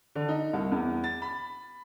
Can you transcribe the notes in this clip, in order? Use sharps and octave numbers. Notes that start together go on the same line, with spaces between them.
D3
D#4
C2
E2
A6
B5